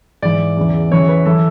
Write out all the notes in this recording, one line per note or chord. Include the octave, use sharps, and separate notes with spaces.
G#2 E3 D5
E2 C#3 E3
F#2 C#3 E3 C#5
B4
E3 A4